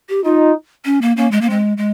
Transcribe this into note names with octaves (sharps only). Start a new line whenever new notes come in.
G4
D#4 F4
C#4
A#3
A#3 C#4
G#3
A#3
G#3 C4
G#3